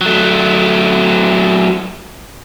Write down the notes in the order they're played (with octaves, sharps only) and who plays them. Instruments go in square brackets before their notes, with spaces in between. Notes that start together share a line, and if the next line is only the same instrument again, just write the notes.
[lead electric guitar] F#3 A3